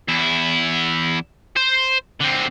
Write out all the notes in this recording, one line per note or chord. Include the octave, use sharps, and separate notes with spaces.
E2 E4
C5
D3 C4